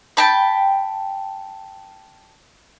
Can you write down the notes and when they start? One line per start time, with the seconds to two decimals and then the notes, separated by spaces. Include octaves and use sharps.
0.17 G5 A5 B5